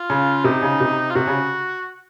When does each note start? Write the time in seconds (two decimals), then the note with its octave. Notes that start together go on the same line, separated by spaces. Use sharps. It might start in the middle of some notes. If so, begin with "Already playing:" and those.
Already playing: F4
0.10 C#3
0.44 C3 D#4
0.62 C#3
0.80 C3
1.10 F4
1.15 C3 F#4
1.27 C#3